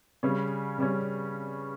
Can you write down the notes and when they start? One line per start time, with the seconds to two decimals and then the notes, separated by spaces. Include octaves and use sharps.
0.23 C#3 G3 C#4
0.78 C#3 G3 C#4